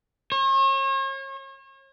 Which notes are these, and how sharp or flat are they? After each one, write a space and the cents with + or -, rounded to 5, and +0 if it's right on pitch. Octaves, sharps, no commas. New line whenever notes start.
C#5 -40